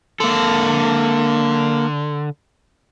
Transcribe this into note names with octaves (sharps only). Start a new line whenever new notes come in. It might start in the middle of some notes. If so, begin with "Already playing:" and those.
D3 A#3 A4